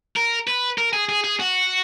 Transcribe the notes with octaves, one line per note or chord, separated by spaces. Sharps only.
A#4
B4
A#4
G#4
G#4
G#4
F#4